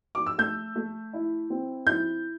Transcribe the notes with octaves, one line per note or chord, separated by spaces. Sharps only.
D6
E6
A3 G6
A3
E4
C4
E4 G6